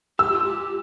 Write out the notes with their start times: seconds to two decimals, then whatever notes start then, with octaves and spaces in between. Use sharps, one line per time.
0.19 G4 E6
0.31 F4
0.44 G4